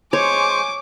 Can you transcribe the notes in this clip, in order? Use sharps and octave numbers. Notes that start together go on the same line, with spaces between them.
G#3 C5 C#5 G#5 C#6 D6